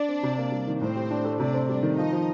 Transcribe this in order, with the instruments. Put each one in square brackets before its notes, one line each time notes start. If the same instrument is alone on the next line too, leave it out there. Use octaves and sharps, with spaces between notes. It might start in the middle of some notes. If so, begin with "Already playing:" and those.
Already playing: [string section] D4 D5
[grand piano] C4
C3
A#3
G3
D#3
[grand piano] A2 [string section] C4 C5
[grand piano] G4
D4
A3
[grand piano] C3 [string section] D4 D5
[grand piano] C4
[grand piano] G3 [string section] D4 D5
[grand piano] D#3
[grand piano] F3 [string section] D#4 D#5
[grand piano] F3